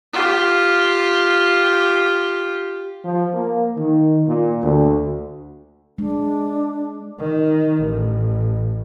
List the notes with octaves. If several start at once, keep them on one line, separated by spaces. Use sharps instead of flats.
F4 G4
F3
A#3
D#3
A#2
D2
G#3 D4
D#3
A1